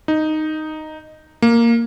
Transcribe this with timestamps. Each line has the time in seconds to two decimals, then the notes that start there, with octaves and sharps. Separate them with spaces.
0.08 D#4
1.42 A#3